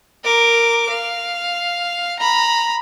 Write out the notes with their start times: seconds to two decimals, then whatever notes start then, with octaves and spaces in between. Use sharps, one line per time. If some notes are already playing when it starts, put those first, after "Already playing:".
0.24 A#4 D6
0.89 F5
2.19 A#5 B5